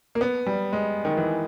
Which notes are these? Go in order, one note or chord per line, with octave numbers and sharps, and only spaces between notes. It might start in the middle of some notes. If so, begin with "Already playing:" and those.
A#3
B3
G3
G#3
D#3
E3